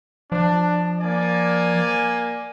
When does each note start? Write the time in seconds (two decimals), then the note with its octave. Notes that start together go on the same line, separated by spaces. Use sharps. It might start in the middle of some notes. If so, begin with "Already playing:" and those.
0.32 F3 D4
1.00 A#3 D5 G#5